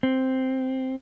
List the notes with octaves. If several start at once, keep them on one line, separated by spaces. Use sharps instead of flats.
C4